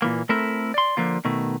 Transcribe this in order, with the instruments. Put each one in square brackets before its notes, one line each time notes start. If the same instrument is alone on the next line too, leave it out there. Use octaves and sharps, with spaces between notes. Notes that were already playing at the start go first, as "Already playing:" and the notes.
[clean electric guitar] A#2 E3 A#3
A3 C4 E4 A4 A#4 E5
D5 C6
D3 F3 A#3 F4
B2 D#3 A3